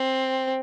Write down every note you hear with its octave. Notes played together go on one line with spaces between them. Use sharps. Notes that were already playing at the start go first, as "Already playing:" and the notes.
Already playing: C4